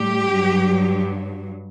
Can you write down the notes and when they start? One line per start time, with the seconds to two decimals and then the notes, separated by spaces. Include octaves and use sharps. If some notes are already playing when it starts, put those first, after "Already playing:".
Already playing: A2 G3 G4
0.30 G2 F#3